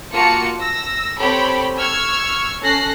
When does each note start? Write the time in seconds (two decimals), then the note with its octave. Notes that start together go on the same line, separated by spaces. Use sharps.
0.12 A#3 F4 F#4 A5 C#7
0.58 E6 A#6
1.19 C4 G4 A4 C#5 G5 B5
1.79 C#6 E6 F6 G#6
2.62 C#4 A4 F#6 A#6 C7